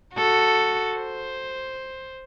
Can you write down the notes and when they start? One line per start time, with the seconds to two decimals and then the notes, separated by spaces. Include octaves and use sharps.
0.15 F#4 A4
0.95 C5